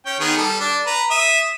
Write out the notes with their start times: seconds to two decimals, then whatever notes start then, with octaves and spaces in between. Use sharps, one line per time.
0.06 C#4 G5
0.20 D#3 B3 G#4
0.38 G3 A4
0.60 D4
0.87 B4 A#5
1.11 E5 D#6